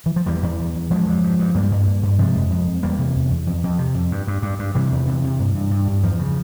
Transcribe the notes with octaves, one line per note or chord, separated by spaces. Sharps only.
E3
F3
E2 E3 G3
E2
E2
E2
G2 F3 G#3
G2
G2
G2
G2 G3 A#3
G2
G2
G2
C3 F3 G#3
F2
F2
F2
E2 G3 A#3
C3
E2
E2
F2
F2
C3
F2
G2
G2
G2
G2
C3 E3 G3
E2
C3
C3
G2
G2
G2
G2
E2 F3
C#3